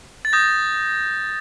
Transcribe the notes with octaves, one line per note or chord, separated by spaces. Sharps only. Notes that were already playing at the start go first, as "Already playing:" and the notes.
A6
D#6 G6 A#6